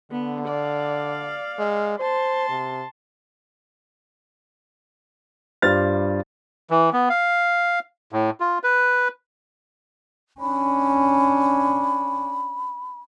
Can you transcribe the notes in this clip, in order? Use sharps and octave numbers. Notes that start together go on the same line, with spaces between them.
D3 B3
D5 F5
G#3
C5 A5 C6
C3
G2 G3 F4 C5 F6 A6
E3
B3
F5
A2
F4
B4
C#4 D4 B5